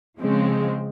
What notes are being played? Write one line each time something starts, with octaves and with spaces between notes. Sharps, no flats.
C#3 F3 G#3 C4